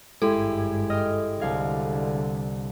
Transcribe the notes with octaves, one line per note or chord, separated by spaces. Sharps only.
G#1 G2 G#3 E4 G4 A4
D#5 G5 F6
C2 D3 F5 G#6